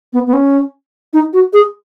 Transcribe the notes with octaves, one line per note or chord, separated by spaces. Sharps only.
B3
B3
C#4
D#4
F#4
G#4